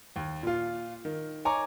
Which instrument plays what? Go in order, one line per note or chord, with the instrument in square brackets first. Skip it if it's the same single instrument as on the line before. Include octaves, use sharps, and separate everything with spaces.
[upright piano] D#2
A#2 F4
D#3
D#4 C#5 G#5 A#5 C#6 D6